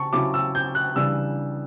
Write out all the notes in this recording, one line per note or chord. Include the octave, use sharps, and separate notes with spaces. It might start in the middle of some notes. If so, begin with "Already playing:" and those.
Already playing: C#3 A5 C#6
C#3 F#3 C#4 E4 D6
E6
G6
F#6
C#3 E3 G3 D4 E6